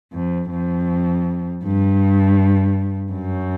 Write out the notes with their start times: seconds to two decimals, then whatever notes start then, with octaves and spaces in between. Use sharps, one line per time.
0.13 F2
0.51 F2
1.64 G2
3.12 F#2